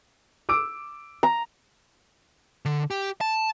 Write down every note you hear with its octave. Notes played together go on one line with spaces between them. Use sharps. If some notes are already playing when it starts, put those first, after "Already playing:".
D6 E6 D7
A#5
D3
G4
A5